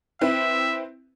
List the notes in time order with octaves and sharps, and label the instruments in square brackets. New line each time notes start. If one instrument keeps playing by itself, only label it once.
[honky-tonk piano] C4 E4 B4 [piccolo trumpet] E5